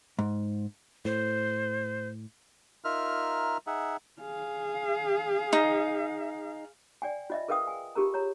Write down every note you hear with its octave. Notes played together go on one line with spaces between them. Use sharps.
G#2
A2 C5
D#4 F4 A#4 E5 F6
D#4 G#4 E5 F#5
G#4 F5
D#4
D5 G5 G#5
F4 D#5 E5
G#4 A#4 B4 F5 G5 D#6
G#5
F4 G4 G#4 A#4 A#5
C#5 A#5